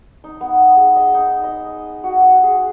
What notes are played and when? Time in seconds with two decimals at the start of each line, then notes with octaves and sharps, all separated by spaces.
0.24 D#4
0.41 B3
0.76 G#4
0.96 D#5
1.14 D#4
1.43 D#5
2.04 F#4
2.43 G#4